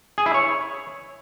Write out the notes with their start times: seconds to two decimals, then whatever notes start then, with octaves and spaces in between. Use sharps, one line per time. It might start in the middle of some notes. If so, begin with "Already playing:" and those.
0.18 G#4
0.26 E4
0.34 C#5